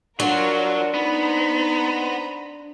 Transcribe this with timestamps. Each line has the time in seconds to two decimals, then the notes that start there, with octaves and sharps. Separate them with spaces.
0.20 F#3 D4 F4 F#4 A#4 F#5
0.94 B3 D#4 C5 A#5 B5